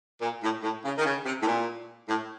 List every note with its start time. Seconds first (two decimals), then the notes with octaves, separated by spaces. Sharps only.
0.21 A#2
0.43 A2
0.63 A2
0.85 C#3
0.98 D#3
1.06 C#3
1.25 C3
1.42 A2
1.47 A#2
2.08 A2